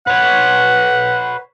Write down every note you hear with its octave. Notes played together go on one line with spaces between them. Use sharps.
B4 C#5 F#5